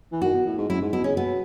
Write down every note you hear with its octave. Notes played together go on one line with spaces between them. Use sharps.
E3
D#3 F#4
B2
A2
G#2
F#2 E4
G#2
B2 E4
C#3 C#4
B2 B3